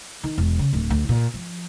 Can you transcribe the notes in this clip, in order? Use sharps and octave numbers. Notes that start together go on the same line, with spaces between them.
D#3
E1
C#3
D1
D2
A#2
F3